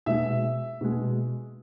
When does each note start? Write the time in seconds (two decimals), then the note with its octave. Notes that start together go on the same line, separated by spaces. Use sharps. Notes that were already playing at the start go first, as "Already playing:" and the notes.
0.06 B2 G#3 E5
0.81 B2 G#3